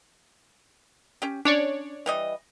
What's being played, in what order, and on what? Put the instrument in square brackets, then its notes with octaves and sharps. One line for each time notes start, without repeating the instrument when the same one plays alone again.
[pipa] C#4 G4
[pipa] C#4 [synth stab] D4 C#5 D5
[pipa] E3 G3 D#5